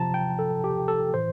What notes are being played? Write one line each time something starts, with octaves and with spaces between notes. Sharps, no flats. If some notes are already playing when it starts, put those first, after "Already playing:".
Already playing: C3 F3 A5 A#5
G5
A4
G4
A4
A2 E3 C5